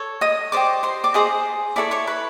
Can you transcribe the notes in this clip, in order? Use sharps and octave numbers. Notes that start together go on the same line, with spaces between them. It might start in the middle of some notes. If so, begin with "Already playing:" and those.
Already playing: A4 C#5
D#5 D#6
G4 C5 D5 D#5 D6
C5 C6
D5 D6
G#4 C5 D#5 D#6
E4 A4 C#5 D5 D6
C#5 C#6
B4 B5